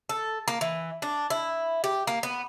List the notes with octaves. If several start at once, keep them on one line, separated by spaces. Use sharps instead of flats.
A4
A#3
E3
D4
E4
G4
A#3
B3